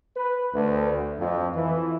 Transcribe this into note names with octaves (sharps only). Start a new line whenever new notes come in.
B4
D2
F2
E3